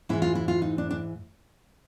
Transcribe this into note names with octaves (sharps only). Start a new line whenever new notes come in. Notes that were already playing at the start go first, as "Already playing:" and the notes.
G#2 E3 E4
F4
E4
F4
D#4
D4
D4